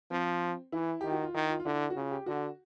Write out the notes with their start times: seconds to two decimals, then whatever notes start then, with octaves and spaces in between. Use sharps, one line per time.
0.11 F3 C4
0.72 E3 E4
1.01 D#3 G4
1.12 F#4
1.23 F4
1.34 D#3 E4
1.49 F4
1.60 F4
1.65 D3 E4
1.90 F#4
1.96 C#3 F4
2.11 G4
2.26 D3 F#4